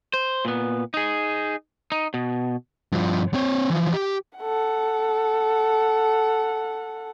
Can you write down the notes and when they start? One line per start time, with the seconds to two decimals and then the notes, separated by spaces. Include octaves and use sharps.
0.14 C5
0.45 A#2 B3
0.94 D#4 G#4
1.92 D#4
2.14 B2
2.92 G2 F3
3.34 C4 C#5
3.70 E3 F3
3.93 G4
4.38 A4 F#5